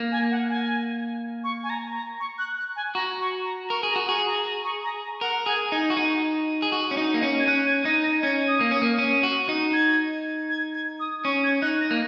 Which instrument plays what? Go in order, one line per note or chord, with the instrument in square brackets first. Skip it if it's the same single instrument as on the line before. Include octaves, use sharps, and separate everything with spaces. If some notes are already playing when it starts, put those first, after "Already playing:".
Already playing: [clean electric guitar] A#3
[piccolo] G#5
F#5
G#5
C#6
G#5
A#5
A#5
C#6
F#6
F#6
G#5
[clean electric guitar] F#4 [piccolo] A#5
[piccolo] C#6
A#5
[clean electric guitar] A#4 [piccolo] C#6
[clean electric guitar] G#4
[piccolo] A#5
[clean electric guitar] F#4
[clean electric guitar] G#4 [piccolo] C#6
[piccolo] A#5
A#5
C#6
A#5
A#5
[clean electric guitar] A#4 [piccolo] F#5
[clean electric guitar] G#4 [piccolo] G#5
[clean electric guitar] D#4 [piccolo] G#5
[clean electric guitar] F#4
D#4
G#4
F#4
C#4
D#4
A#3
C#4
[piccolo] G#6
[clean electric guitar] C#4 [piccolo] F#6
[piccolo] G#6
[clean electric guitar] D#4 [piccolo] A#6
[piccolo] A#6
[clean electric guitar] C#4 [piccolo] G#6
[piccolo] D#6
[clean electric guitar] A#3
[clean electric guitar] C#4 [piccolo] D#6
[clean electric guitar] A#3
C#4
F#4
D#4
[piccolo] G#6
G#6
G#6
D#6
[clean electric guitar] C#4 [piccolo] C#6
[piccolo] G#6
[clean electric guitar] D#4 [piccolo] F#6
[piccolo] A#6
[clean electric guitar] A#3